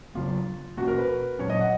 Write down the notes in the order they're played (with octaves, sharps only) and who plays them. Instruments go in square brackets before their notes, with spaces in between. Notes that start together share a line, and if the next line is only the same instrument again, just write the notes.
[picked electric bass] C#3 F#3 B3 [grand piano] F4
[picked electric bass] B2 A#3 C#4 [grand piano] F#4
[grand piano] A#4
B4
[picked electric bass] A#2 F#3 C#4 [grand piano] C#5
[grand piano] D#5
F#5